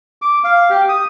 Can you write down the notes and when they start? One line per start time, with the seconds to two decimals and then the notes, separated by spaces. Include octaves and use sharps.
0.22 D6
0.44 F5
0.70 G4
0.89 D#6